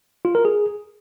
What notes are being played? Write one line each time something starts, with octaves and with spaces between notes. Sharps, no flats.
F4
A#4
G#4